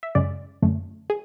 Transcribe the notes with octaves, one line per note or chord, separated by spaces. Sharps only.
E5
F#2 C#3 G#3 D5
F#2 D3 F#3 A3
G#4